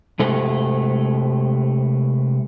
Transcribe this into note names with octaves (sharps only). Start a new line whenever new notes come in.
C3 G#3 A3 A4